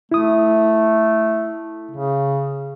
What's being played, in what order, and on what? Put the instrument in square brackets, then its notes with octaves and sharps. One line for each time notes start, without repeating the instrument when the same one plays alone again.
[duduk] A3 [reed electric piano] E4 D#6
[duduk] C#3